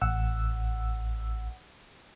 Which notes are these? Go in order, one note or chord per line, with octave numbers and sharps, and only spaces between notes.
A1 F#5 E6